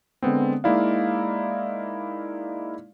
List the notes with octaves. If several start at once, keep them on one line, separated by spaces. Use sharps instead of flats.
D3 G#3 B3 C4
G#3 A#3 D#4 E4 D5 F5